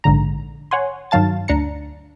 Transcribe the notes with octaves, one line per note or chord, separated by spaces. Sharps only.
A#1 G#2 D3 A#5
C#5 F#5 G#5 C6
G2 D#3 F#3 F5 A5 A6
D2 D4 A#5 C#7